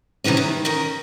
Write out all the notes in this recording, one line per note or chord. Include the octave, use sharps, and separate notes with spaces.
C3 D#3 E3 G3 C#4
D#3
D#3 C#4 A#4